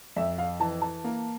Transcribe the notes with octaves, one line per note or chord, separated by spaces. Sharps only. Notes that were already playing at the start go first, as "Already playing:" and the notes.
F2 E5
F5
E3 A5
A5
A#3